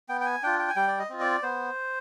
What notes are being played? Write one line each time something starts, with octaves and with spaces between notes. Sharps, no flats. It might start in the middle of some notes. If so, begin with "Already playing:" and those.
B3 G5
G5
G#5
D4 F4 G5
G5
G#5
G3 G5
D5
D#5
C4 F4
D5
B3 C5